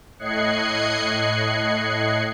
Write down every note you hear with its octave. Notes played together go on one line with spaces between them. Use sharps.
A2 D#5 F#6 G#6 C7 C#7